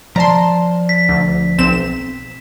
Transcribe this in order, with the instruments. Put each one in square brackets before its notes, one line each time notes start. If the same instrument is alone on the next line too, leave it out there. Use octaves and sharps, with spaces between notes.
[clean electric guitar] F3 D5 A5 [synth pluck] A#5 C6
[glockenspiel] B6
[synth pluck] D2
B1 C4 E7